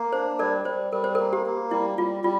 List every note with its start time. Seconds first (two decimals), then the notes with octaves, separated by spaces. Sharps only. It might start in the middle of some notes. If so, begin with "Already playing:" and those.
Already playing: A#3
0.13 D4 C5
0.39 G3 A#4 D5
0.65 G3 C5
0.93 G3 A#4
1.04 C5
1.15 A#3 A#4
1.33 G4
1.46 A#3
1.71 G3 E4
1.98 G3 F4
2.24 G3 F4